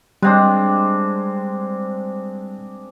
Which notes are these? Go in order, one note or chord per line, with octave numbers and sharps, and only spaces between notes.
G3 G#3 C4 D4